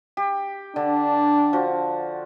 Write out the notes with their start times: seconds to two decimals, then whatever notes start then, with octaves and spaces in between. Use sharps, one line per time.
0.17 G4
0.76 D3 D4
1.53 F3 F#4